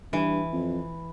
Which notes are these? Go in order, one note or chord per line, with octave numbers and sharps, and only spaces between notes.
G2 E3
F2